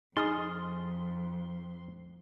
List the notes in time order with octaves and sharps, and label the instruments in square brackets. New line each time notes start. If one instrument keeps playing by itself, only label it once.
[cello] F2 [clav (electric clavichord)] D#4 G#4 [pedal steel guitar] C6 [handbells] D#6 F6 A6